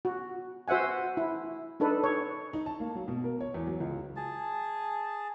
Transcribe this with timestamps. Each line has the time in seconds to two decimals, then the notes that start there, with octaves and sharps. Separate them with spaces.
0.05 F#4
0.68 F#4 C5 E5 F#5 G#5
1.17 E4
1.80 D4 D#4 A4 B4
2.04 C#5
2.53 D#4
2.66 A5
2.80 A#3
2.95 F#3
3.08 B2
3.24 A#4
3.41 C#5
3.54 E2
3.67 F#3
3.80 C#2
4.16 G#4 A5